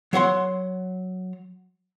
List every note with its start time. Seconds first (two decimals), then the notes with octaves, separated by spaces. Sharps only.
0.13 F#3 C#5 F#5 C6